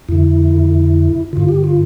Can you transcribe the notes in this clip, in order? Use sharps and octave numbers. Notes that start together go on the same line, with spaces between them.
F2 D3 E4
G2 D3 F4
G4
F4